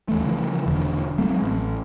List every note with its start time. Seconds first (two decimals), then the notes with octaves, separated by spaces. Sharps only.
0.09 D#2 E3 A3
0.25 C#3 E3 F3
0.66 E1 E2 D3
1.18 F#3 G#3 A3 C4
1.42 A1